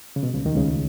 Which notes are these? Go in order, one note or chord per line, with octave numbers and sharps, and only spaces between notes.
C#3
B2
C#2 C#3
D#2 D#3
C#2 C#3